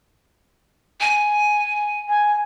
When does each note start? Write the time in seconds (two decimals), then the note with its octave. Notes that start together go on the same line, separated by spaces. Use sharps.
1.01 G#5
2.09 G#5